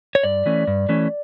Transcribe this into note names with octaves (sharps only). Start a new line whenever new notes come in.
C#5
G2 D5
E3 A3 C#4
G2
E3 A3 C#4